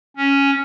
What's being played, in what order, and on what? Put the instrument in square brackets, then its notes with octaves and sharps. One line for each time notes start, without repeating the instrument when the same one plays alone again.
[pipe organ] C#4